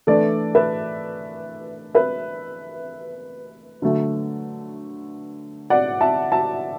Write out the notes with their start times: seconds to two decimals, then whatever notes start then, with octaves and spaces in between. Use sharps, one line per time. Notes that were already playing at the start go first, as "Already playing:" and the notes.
0.07 E3 A3 D4 A4 D5
0.55 B4 E5
1.95 B4 E5
3.82 D3 F#3 A3
5.70 D5 F#5
6.01 E5 A5
6.32 E5 A5